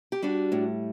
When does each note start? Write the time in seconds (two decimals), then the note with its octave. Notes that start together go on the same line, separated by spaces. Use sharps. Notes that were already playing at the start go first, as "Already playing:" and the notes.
0.12 G4
0.22 G3 D4 F#4
0.52 A2